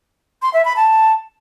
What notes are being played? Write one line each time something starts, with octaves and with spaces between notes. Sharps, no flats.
C6
E5
B5
A5